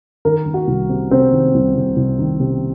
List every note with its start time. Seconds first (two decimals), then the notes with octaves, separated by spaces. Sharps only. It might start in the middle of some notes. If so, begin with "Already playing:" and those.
0.25 D#3 A#4
0.46 D#3
0.54 F#4
0.67 C2
0.89 C3
1.11 C3 C4
1.32 D#3
1.54 C2
1.75 C2
1.96 C2
2.19 D#3
2.40 C3